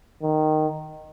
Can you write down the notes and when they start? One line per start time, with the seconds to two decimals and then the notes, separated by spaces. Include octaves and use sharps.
0.22 D#3